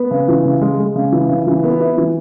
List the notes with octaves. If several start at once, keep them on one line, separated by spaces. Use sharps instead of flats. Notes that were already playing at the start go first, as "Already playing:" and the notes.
Already playing: B3
C#3
E3
C#3
G#3
G#3
C#3
E3
C#3
E3
B3
E4
E3